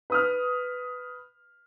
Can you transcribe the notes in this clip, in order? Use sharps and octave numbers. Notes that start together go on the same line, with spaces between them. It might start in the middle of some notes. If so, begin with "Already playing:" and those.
B4 D#6 F6